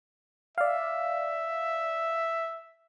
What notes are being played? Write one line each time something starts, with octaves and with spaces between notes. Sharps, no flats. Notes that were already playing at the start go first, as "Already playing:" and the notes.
D5 E5 F5